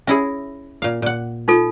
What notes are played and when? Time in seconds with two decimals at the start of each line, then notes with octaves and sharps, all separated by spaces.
0.07 C#4 E4 G#4 E5
0.82 A#2 F5
1.02 A#2 F#5
1.48 D#4 F4 A4